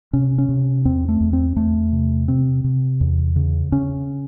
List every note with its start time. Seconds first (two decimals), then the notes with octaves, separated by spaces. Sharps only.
0.13 C3 C#4
0.38 C#4
0.49 C3
0.85 E2 C4
1.09 A3
1.20 E2
1.33 C4
1.56 E2 A3
1.92 C3
2.28 C3 C4
2.64 C3
3.01 E2
3.36 C#3
3.72 C#3 C#4